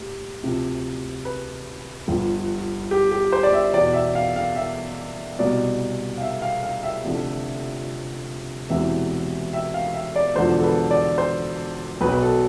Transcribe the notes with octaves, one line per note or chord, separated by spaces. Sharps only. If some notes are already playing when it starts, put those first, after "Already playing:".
Already playing: A2 G4
D2 C3 F3
B4
G1 G2 F3
G4
G4
C5
D5
E5
E2 B2 D5
E5
F5
F5
E5
C2 B2 D5
F5
E5
F5
F5
E5
F1 F2 D3
E1 E2 C3 E3 E5
E5
F5
E5
D5
E1 E2 D3 F3 C5
A4
B4
D5
C5
B1 B2 B4
B4
A4